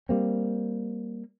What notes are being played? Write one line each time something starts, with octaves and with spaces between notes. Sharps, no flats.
G3 A#3 C4